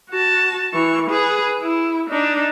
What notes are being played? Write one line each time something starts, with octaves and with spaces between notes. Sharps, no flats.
F#4 A5
E3 C#6
G#4 B4
E4
D4 D#4